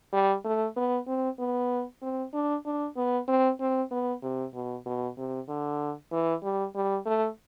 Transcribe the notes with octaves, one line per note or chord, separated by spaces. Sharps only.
G3
A3
B3
C4
B3
C4
D4
D4
B3
C4
C4
B3
C3
B2
B2
C3
D3
E3
G3
G3
A3